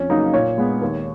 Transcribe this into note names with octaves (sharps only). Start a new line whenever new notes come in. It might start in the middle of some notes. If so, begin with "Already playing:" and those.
Already playing: F2 C#4
C#3 F#3 A#3 D#4
A#2 C#5
G#3 B3
D#2